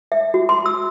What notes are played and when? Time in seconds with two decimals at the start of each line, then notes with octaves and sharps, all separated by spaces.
0.12 E5
0.34 F#4
0.49 C6
0.66 E6